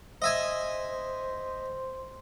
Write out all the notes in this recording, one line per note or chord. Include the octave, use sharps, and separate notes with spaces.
C5 D#5 E5 G#5